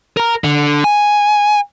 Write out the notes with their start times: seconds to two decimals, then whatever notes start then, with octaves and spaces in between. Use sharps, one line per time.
0.17 A#4 A#5
0.44 D3
0.84 G#5